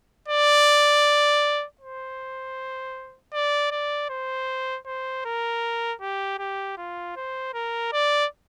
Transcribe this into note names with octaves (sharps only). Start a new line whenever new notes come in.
D5
C5
D5
D5
C5
C5
A#4
G4
G4
F4
C5
A#4
D5